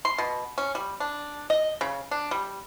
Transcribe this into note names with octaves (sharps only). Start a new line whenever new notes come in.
C6
B2
C#4
G3
D4
D#5
C#3
D4
G3